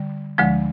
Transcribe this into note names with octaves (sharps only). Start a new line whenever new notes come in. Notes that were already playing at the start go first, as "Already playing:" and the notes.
Already playing: D3 G3
D2 D3 F3 G#3